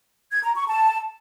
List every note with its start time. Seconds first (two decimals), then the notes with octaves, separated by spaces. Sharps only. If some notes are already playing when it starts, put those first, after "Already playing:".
0.32 G#6
0.43 A#5
0.55 C#6
0.67 A5